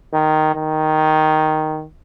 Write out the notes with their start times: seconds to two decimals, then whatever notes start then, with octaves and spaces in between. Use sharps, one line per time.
0.13 D#3
0.55 D#3